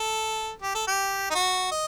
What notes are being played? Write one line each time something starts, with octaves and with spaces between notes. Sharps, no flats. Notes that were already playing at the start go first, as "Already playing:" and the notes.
Already playing: A4
G4
A4
G4
D#4
F#4
D#5